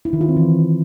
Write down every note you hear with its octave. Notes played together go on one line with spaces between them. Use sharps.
E4
D#3
F4
C4
E3